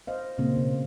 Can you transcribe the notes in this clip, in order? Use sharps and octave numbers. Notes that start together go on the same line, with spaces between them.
C5 D#5 F5
A#2 C#3 A#3 C4
B2